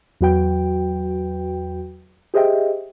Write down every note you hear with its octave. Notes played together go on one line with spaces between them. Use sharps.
E2 F#3 F#4 B4 G5
G4 G#4 C5 D#5 E5 G5